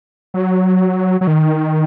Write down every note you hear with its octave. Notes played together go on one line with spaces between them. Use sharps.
F#3
F#3
D#3